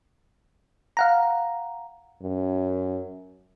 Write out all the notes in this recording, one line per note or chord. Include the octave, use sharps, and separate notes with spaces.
F5 F#5 A#5
F#2